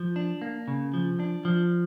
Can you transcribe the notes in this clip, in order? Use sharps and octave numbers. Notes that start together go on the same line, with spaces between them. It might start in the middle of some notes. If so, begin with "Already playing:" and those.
Already playing: F3
D4
A#3
C#3
F3
D4
F3